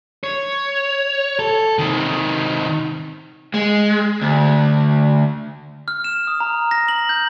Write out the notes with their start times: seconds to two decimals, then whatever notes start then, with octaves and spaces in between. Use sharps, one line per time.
0.24 C#5
1.39 A4
1.79 C3 D#3
3.54 G#3
4.22 D2
5.88 F6
6.04 E7
6.27 D#6
6.40 A#5
6.71 A#6
6.88 F#7
7.09 G6